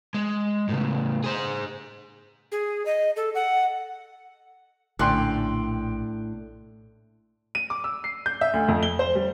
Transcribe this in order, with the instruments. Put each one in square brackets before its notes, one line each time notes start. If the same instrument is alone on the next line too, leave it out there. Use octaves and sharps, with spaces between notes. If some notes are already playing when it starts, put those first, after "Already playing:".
[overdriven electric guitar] G#3
A2 C#3
G#4 C5
[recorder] G#4
D#5
A4
F#5
[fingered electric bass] A#1 [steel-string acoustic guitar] A2 [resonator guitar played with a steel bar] D3 C#4 D5 [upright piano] G5 C6 F#6
[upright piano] D#7
D6
E6
C7
G6
E5
D2
F2
G7
C5
G3